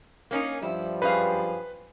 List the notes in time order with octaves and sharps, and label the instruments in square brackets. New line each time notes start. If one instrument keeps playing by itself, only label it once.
[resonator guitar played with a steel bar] A#3 C#4 D#4
[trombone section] G2 F3 G3 [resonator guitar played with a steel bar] E4
[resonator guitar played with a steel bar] F#2 G#4 F5 [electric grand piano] B4